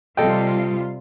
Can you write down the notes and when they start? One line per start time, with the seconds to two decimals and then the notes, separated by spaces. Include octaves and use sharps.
0.17 C3 G3 F4 A4 D#5 G5